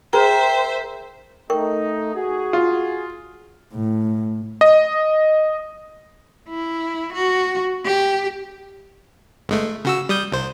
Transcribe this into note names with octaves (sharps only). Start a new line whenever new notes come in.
G#4 A#4 C5 E5 G5
A3 D#4 A#4 G5 C#6
F#4 G#4
F4
A2
D#5
E4
F#4
G4
G1 G#3 A3
C#3 F#4 E6
G3 D#6 G6
C2 C5